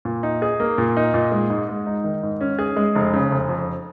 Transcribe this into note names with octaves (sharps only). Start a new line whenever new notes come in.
A#2
D#4
G#4
A#3
A#2
D#4
A#2
G#3
G#2
G#3
D#4
D#3
G#2
C#4
G#4
G#3
F1
C#3
F1
F2